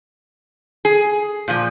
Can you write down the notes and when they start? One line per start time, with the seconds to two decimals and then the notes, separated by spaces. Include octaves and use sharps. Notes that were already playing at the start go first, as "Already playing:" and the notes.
0.85 G#4
1.48 A#2 F3